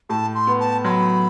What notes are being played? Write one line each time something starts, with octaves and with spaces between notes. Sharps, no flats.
A2 A5
C6
B3
A5
F#3 B5 C6